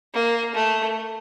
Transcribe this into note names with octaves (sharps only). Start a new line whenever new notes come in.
A#3
A3